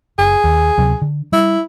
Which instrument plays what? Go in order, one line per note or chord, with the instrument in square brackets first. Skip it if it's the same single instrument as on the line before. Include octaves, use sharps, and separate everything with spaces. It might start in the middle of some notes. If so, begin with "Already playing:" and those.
[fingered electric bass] F#1 [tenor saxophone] G#4
[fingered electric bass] D#2
D2 C3 F#3
D3
[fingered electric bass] G3 [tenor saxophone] E4